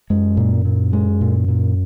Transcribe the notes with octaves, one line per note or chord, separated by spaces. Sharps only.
F#2 G#3
A#2
A#2
G#3
A#2
A#2